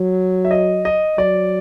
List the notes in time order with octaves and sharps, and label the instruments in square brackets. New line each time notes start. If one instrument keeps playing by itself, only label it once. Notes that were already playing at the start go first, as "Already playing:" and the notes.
Already playing: [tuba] F#3
[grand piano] E5
D#5
D#5
[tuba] F#3 [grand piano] D5